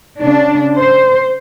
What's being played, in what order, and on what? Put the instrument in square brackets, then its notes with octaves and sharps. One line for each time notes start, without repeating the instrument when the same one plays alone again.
[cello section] C#3 D4
C5